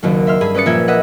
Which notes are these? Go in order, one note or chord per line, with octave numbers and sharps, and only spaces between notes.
F#1 D#2 F#3
E5 C6 F6
G2 G#4 B5 D#6
C#4 B4 D5 D#6 A6 C#7
A#1 A#3 E5 G#6
B4 D#5 E5 F#5